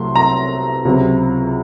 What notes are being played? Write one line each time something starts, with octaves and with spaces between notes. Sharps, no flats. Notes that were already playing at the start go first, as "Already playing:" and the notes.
Already playing: C2 C3 F#3 A3 C6
A#5
C#2 C3 F#3